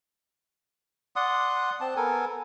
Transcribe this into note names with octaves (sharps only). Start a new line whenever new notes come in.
D5 F#5 C6 D#6
C4 A5
B3 A4 A#4 G#5